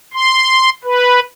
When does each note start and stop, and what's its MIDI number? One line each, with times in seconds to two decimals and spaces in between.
0.14 0.70 84
0.84 1.20 71